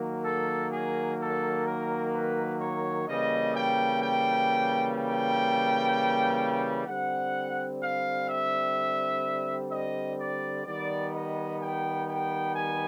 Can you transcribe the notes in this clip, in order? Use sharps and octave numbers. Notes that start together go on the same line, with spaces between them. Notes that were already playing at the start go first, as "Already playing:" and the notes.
Already playing: D#3 F#3 A#3
A4
G#4
A4
A#4
B4
C#5
C#3 E3 G3 A#3 D#5
G5
G5
G5
D3 G3 C4 F#5
F5
E5
D#5
D5
D#3 G3 B3 D5
D#5
G5
G5
G#5